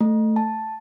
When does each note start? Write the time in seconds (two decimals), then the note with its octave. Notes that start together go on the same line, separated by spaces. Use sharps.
0.01 A3
0.36 A5